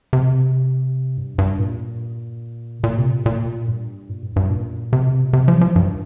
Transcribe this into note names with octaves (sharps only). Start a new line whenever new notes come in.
C3
G2
G2
A#2
A#2
C3
A#2
A#2
G2
A#2
G2
G2
A#2
C3
A#2
C3
F3
F3
G2